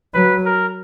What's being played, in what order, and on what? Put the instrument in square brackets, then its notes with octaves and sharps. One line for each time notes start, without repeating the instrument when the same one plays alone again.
[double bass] F#3 [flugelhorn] B4
[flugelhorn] A#4